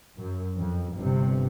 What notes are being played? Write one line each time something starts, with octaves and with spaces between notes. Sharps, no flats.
F#2
F2
G1 G2 C3